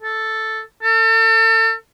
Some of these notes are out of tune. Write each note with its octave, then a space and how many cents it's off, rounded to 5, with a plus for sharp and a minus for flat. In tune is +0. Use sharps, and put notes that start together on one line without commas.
A4 +0
A4 +35